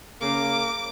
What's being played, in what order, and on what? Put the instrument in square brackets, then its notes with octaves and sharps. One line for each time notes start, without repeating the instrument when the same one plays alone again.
[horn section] C#3 A#3 [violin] D6